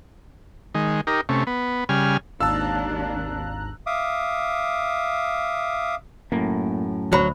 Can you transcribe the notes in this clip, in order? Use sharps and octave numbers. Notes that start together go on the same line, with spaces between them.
D#3 G#3
D#4 G4 A#4
C3 A3 C#4
B3
C#3 G3 G#5 F6
G#1 D#2 D4 F5 A5 A#5 E6 F#6
E5 F5 D6 D#6
F#2 A2 A#3
D2 F#3 C5 B5